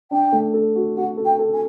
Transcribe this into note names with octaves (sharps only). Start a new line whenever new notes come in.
D4 G5
A3
A4
F#4
F#4 F#5
A4
G5
A4
G#5